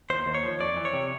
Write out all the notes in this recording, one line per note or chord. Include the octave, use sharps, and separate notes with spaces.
D#2 C5
D#2
C#5
F3
F2 D5
E3
C#5
C3